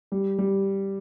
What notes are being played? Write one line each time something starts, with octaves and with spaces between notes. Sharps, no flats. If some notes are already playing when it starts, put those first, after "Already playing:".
G3
G3